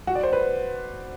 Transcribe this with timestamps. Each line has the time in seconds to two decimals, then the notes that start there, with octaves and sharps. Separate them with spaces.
0.07 F#4
0.15 D5
0.23 C5
0.33 B4